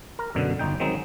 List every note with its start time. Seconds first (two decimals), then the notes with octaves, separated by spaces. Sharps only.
0.19 A#4
0.35 F#2 B2 D3
0.59 G1 D#4 G5
0.80 D#3 F#3 G#3 C4 D#4